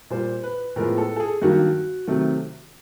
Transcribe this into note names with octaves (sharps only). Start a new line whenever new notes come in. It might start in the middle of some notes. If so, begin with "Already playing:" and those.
A#2 G3 A#3 C5
B4
A2 F3 G#3 B3 A#4
A4
A4
G#4
G2 D#3 F#3 A#3 F#4
C3 D#3 F#3 A3